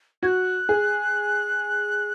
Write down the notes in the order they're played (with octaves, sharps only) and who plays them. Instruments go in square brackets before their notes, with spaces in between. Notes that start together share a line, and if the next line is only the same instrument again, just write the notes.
[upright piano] F#4 [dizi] F#6 G#6
[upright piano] G#4